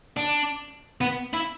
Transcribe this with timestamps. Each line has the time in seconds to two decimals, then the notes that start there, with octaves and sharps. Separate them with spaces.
0.17 D4
1.01 B3
1.34 E4